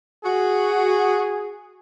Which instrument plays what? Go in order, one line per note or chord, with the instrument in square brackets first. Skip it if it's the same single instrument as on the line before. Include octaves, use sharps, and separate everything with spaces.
[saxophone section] F#4 [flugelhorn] G#4